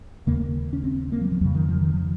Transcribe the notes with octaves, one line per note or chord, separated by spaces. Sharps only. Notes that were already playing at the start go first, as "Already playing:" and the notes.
D#2 C#3 A#3
C#4
C4
A#3
F#3
F3
F2 C#3 F#3
D#3
F3
D#3
F3